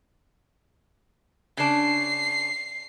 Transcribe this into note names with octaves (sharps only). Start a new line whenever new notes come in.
C#3 D4 C7